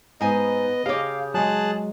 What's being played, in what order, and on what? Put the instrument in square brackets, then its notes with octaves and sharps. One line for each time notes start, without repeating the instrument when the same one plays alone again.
[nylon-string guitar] G#2 G#5 [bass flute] B3 [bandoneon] D#5
[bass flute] C#3 [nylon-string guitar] G4 C#5 [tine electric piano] F5 D6
[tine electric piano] F#3 G#3 [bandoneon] G#4 A5 F#6